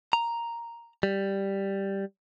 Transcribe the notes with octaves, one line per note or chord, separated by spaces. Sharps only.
A#5
G3